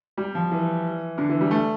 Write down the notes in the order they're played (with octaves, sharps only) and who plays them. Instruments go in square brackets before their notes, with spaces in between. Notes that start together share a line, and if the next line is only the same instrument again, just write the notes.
[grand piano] G3
F3
E3
D3
E3
G3
A3